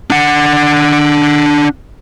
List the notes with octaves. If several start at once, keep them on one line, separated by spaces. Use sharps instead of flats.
D4 F#5